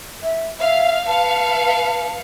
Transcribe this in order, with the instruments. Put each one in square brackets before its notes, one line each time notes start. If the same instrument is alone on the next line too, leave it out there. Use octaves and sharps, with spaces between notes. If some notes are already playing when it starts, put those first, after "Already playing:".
[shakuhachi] E5
[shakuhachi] E5 [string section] F5
[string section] B4 F5 C#7 [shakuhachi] A5